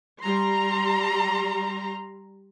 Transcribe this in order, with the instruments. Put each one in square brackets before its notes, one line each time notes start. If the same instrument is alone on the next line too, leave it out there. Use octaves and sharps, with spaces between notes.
[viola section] G3 A#5 C6